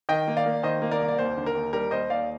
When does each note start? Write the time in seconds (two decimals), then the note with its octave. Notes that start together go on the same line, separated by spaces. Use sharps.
0.09 D#3 D#5 G5
0.28 A#3
0.37 D5 F5
0.46 A#3
0.63 D#3 C5 D#5
0.82 A#3
0.91 A#4 D5
1.00 C2
1.08 D5
1.18 D#2 C5
1.37 D3
1.46 A#4
1.55 D#2
1.73 G3 A#4
1.91 D#2 C5 D#5
2.09 D#2 D5 F5